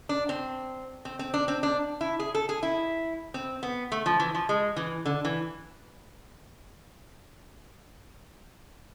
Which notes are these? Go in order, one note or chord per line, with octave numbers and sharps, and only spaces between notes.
D4
C4
C4
C4
D4
C4
D4
E4
G#4
A4
G#4
E4
C4
B3
A3
F3
E3
F3
G#3
E3
D3
E3